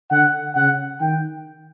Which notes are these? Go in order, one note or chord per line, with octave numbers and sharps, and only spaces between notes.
D3 F#5
C#3 F#5
D#3 G5